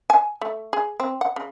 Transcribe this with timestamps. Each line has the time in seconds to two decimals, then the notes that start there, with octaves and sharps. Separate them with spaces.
0.10 G#5
0.41 A3
0.73 G#4
1.00 C4
1.21 F#5
1.36 C#3